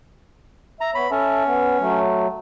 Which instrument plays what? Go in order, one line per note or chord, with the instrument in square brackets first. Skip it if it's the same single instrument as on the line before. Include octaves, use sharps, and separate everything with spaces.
[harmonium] E5 [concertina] A#5
[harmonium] B3 C#5 [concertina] B5
[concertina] C#4 [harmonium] A4 E5 A5
[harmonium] B3
F#3 A3